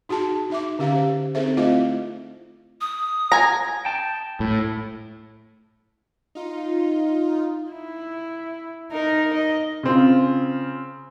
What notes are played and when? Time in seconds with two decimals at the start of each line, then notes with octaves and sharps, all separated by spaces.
0.09 D#4 F#4 G#4 A5
0.50 D#4 E5 D6
0.79 D3 C#4 G4 F5
0.95 C5
1.35 C4 D#4 G#4 A4 C5 E5
1.57 A3 C4 E4 F4 D#5 F5
2.81 D#6
3.32 G#5 A#5
3.85 G5 A5
4.40 A2
6.35 D#4 F4
7.72 E4
8.92 D#4 A#4
9.34 D#5
9.83 C#3 C4 F4